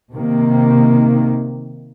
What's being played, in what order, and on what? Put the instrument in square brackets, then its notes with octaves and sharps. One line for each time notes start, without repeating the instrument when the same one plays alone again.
[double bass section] C3 D#3 A#3